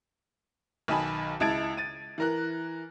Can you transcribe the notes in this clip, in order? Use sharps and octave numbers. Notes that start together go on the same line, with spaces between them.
B1 D#3 D#4 G#5 A5 B5
C#2 E4 A5 G#6 A6 D7
A6 D#7
E3 A#4 F#6